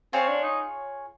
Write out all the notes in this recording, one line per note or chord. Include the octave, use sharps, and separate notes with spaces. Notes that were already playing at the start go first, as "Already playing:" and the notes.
C4 F4 G#4 C#5
D4
D#4